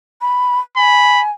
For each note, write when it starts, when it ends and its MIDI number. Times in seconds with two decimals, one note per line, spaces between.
0.21 0.60 83
0.77 1.31 80
0.77 1.21 83